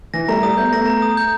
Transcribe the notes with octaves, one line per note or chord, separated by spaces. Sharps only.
E3 A#6
G3 A3 A#5
G3 A3 D#6
A3 B3 G6
A3 B3 A#6
A#5
D#6
G6